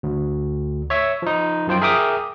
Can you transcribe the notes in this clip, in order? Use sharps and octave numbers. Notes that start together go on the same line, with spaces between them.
D2
C#5 E5
F3 D#4
F#2 F3 C5 G5
G#4 A#4 E5 G5 D6 D#6